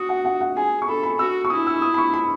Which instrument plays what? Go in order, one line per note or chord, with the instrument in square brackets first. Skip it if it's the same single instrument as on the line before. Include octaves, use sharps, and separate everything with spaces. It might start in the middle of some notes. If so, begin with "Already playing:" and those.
Already playing: [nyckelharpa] F#4 [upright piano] D#6
[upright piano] F#5
F#5
F#5
[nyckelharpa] G#4 [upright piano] G#5
[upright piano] C#6
[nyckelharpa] A4 [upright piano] B5
[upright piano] B5
[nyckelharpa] F#4 [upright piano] E6
[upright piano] C#6
[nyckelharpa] E4 [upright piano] D#6
[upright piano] E6
D#6
B5
C#6
B5